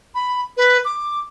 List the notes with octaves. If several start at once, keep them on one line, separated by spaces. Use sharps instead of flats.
B5
B4
D6